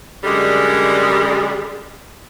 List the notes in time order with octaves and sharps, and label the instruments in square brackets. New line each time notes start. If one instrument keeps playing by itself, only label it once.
[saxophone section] F#2 D3 G3 G#3